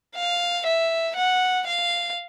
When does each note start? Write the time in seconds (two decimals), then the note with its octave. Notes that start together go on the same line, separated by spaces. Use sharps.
0.16 F5
0.67 E5
1.16 F#5
1.67 F5